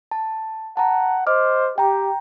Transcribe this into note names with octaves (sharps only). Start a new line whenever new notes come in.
A5
F#5 A5 A#5
C5 D#5 D6 F6
G4 G5 A#5